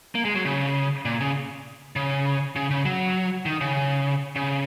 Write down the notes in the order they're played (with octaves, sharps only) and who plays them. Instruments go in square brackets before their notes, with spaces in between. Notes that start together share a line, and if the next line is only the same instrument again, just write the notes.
[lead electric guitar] A#3
G#3
F#3
C#3
A#2
C#3
C#3
C#3
C#3
F#3
D#3
C#3
C#3